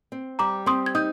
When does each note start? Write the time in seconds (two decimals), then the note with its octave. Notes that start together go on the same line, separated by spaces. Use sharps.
0.12 C4
0.39 G3 A#5 D6
0.66 C4 C6 D#6
0.86 G#6
0.95 D#4 D#6 G6